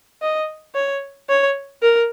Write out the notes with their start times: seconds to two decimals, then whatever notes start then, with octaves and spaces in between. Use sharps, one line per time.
0.22 D#5
0.74 C#5
1.29 C#5
1.82 A#4